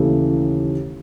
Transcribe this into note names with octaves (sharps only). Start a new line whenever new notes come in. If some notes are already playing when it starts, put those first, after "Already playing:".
Already playing: D#2 C#3 E3 A3